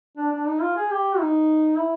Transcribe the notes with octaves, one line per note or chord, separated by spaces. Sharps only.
D4
D4
D#4
F4
G#4
G4
D#4
E4